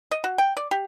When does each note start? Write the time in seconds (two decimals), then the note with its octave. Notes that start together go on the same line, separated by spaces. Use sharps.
0.11 D#5
0.24 F#4
0.38 G5
0.57 D5
0.71 G4